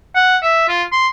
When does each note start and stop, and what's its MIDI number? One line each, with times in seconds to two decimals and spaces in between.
0.15 0.37 78
0.42 0.65 76
0.69 0.83 65
0.92 1.08 84